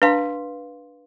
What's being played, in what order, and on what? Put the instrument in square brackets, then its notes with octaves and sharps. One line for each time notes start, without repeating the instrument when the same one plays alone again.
[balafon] D4 A5 [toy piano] B4 F5 C6